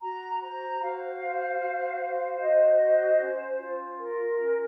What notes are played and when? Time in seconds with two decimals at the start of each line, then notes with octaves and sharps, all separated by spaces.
0.01 F#4 A#5
0.41 C5 A#5
0.80 F#4 F5
1.21 C5
1.60 F#4
2.00 C5
2.39 F#4 D#5
2.81 C5
3.19 C#4
3.59 F4
3.99 A#4
4.39 C#4